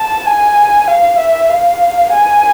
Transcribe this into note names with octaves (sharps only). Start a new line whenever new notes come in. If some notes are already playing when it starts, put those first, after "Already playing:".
Already playing: A5
G#5
F5
E5
F5
G#5